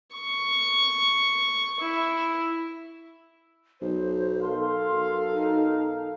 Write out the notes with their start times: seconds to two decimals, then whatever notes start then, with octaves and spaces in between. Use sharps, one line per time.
0.14 C#6
1.80 E4
3.81 B1 C5
4.42 A4 A#4 F5 C6
4.92 B1
5.34 D#4